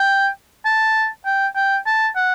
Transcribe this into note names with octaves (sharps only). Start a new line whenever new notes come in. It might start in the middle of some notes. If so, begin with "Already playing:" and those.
Already playing: G5
A5
G5
G5
A5
F#5